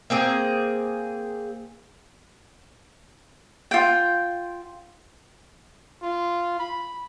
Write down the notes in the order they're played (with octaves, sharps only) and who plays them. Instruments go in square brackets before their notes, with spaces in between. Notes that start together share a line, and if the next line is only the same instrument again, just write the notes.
[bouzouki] A#3 C4 G#4
[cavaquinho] F4 G5
[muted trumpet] F4
B5